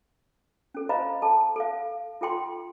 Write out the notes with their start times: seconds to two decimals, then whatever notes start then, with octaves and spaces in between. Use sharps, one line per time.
0.74 C#4 A4
0.89 C5 D#5 F5 A#5 B5
1.22 A4 A5
1.56 A4 F5
2.21 F4 A4 G5 C6